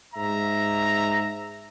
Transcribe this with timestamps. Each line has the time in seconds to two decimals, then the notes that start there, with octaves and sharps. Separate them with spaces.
0.14 G#2 E5 A#5